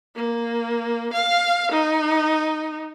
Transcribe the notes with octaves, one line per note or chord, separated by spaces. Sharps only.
A#3
F5
D#4